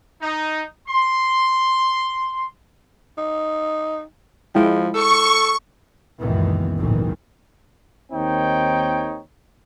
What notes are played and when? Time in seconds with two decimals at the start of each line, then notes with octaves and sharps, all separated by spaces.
0.22 D#4
0.88 C6
3.18 D#4
4.55 F3 G#3 E4 G5
4.94 A4 C#6
6.19 C#2 F#2 A#2 D#3 E3 B3
6.79 G#1 D2 A#2 D#3 E3 F#3
8.12 D#2 D#3 C4 D#4 C#5 G5